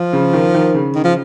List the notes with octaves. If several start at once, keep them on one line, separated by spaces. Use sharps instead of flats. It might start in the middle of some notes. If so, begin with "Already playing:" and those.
Already playing: F3
C#3
D#3
D#3
C#3
D#3
F3